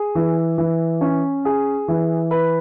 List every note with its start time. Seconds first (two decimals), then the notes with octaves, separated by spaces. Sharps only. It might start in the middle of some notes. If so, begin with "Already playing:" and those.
Already playing: G#4
0.15 E3
0.58 E3
1.01 C#4
1.45 G#4
1.88 E3
2.31 B4